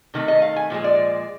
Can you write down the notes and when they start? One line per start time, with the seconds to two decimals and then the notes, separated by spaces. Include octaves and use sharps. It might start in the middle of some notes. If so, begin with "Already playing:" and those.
0.14 C3 D#3 A3
0.28 D#5
0.42 F5
0.56 G#5
0.70 A#2 F3 G#3
0.84 D5